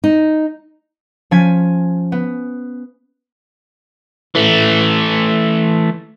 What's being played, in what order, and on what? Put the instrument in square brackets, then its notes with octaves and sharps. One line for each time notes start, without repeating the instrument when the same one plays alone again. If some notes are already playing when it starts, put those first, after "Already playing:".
[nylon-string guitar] D#4
[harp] F3 C#4 G#5 G#6 B6
B3
[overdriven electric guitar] E3 A3